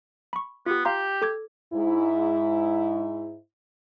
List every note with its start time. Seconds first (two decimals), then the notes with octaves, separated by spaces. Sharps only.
0.33 B5 C#6
0.66 B3 F4 G4
0.85 G4 F5 A#5 C6
1.22 A4 D6 G#6
1.73 G#2 E4